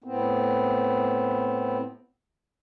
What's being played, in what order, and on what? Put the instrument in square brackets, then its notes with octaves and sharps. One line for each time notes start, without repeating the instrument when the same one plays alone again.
[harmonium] A2 B3 C4